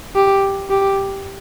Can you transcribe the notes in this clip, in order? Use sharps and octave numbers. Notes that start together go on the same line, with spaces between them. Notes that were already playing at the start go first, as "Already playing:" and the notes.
G4
G4